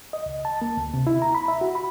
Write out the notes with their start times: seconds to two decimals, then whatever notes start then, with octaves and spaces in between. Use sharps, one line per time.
0.13 D#5
0.26 C#2
0.45 A5
0.62 A#3
0.77 D2
0.94 C3
1.07 E4
1.22 A#5
1.35 B5
1.48 E5
1.61 F#4
1.75 B5